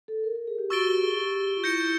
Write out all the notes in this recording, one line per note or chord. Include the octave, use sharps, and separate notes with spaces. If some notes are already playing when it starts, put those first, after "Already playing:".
A4
A#4
A#4
G#4
G4
F#4 C#6 E6 A6 D7 G7
G4
G#4
G4
F4
E4 G6 A#6 C#7